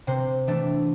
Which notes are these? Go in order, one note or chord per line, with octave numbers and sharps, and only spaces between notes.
C3 C5
E3 A3 D4